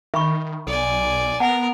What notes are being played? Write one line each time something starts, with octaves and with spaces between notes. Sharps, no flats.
D#3 E5 B5 C#6
B1 A4 D5 G#5
B3 A#4 F#5 A5